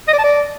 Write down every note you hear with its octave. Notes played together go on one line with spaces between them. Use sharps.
D#5
D5
A5
D5